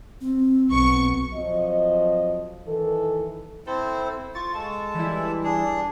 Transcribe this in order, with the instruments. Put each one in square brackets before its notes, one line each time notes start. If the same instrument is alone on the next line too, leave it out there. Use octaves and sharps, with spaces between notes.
[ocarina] C4
[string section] B1 C#6
[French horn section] F2 F3 F#3 D#5
D#3 E3 A4
[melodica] C4 E4 C5 [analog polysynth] A4
[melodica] F4 [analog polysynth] C#6 A6
[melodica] G#3 A4 A5
[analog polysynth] E3 G3 E4
[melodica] D4 G#4